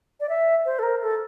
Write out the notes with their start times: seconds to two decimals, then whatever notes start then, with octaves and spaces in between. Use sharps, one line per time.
0.20 D5
0.29 E5
0.65 C5
0.79 A4
0.83 A#4
1.02 A4